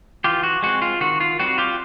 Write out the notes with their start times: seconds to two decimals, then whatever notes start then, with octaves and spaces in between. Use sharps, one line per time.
0.24 E3 F4 G4
0.43 F#4
0.62 G#3 C4 F#4
0.82 F4
1.01 D#3 F#4
1.20 F4
1.39 G3 C4 F#4
1.58 F4 G4